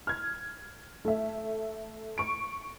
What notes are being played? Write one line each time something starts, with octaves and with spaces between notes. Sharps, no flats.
F6 G#6
A3 E5
C#6 D7